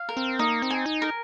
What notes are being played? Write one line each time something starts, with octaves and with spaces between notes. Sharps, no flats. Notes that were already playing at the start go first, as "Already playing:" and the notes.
Already playing: F5
A#4
C4
A#3 D#4
C4
G#5
D#4
A#4